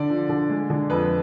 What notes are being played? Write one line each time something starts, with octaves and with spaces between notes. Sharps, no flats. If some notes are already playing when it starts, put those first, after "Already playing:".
Already playing: D3 D5
F3
D3
G#3
D3
F2 B4